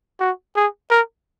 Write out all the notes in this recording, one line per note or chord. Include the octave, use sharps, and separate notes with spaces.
F#4
G#4
A#4